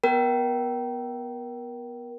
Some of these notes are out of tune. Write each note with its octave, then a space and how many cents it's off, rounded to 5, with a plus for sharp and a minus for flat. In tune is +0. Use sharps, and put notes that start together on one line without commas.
B3 -5 A#4 +30 G5 -25